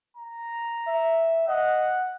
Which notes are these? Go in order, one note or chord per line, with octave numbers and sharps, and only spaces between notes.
A#5
E5
D#5 F#5